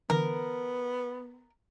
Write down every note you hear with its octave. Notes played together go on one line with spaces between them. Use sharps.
D3 E3 B3 A#4